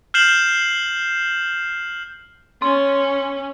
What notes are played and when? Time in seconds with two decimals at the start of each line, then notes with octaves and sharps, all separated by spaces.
0.14 F6 G6 C7 E7 F#7
2.62 C#4 C6